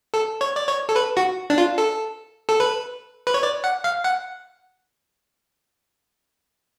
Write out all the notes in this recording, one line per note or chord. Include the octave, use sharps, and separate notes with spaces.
A4
C#5
D5
C#5
A4
B4
F#4
D4
F4
A4
A4
B4
B4
C#5
D5
F#5
F5
F#5